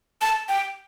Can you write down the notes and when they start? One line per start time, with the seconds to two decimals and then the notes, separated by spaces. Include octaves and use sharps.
0.22 A5
0.49 G5